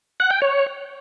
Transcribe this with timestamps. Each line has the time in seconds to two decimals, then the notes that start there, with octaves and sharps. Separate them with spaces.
0.20 F#5
0.31 G5
0.42 C#5